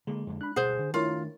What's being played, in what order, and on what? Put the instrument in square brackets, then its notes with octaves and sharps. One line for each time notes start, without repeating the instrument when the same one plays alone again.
[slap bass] D3 A#3 [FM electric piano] G#3
[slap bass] F2 D3
[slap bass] D4 [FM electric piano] B5 F#6
[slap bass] D2 G2 B2 [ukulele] G#4 C5 [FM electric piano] F#5
[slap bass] D3
[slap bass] D#3 A3 D4 [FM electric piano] E4 A#4 C#5 [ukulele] F4